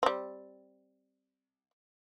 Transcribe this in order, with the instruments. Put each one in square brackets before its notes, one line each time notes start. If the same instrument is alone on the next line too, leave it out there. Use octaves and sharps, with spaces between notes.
[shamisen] G3 C4